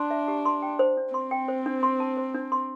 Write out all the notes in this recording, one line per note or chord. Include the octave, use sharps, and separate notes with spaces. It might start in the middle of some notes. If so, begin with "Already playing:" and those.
Already playing: D4 C6
E5
G4
C6
G5
C5
D4
C4 C6
G5
C5
D4
C6
A5
C5
D4
C6